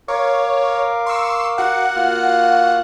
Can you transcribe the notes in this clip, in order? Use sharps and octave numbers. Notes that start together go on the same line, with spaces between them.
A#4 C#5 F5 D6
C6 C#6 E6
F#4 F#5
A#3 F4 F6